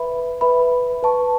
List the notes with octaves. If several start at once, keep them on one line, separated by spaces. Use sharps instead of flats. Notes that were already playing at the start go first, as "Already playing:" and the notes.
Already playing: B4 E5 B5
B4 E5 B5
B4 A5 C#6